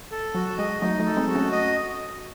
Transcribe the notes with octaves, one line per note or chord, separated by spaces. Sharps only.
A4
F#3 F#4
G#3 D#5
F#3 A3 D#4
F#3 A3
A4
G#3 C4
F#4
A3 C#4
D#5